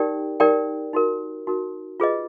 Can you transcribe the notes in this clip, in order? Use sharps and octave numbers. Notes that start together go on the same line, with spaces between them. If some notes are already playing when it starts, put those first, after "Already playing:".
Already playing: D#4 G4 A#4 D5 G5
D#4 G4 A#4 D5 G5
D#4 F#4 A#4
D#4 F#4 A#4
F4 G#4 B4 D#5